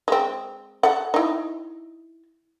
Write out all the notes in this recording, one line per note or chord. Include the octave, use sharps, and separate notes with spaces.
G#3 C4
A4 F#5
D#4 E4